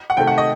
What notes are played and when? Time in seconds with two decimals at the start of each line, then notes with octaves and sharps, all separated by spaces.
0.10 F#5
0.17 C3 D#3 A3 G5
0.27 F#5
0.38 D#5